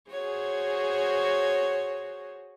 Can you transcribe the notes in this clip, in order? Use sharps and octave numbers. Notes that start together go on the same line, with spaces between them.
F#4 G#4 C5 C#5